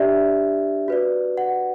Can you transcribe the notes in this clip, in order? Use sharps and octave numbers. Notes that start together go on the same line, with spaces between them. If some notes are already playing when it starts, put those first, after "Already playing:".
Already playing: D4 G4 D5 E5
F#4 B4 D5
F#5